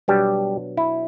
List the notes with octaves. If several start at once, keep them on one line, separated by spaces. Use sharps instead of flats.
B2 F#3 G3 B3 D4 G4
E4